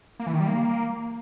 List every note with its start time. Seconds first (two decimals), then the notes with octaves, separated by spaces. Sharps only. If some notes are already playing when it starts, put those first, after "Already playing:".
0.20 A#3
0.27 E3
0.34 D#3
0.41 G3
0.48 A#3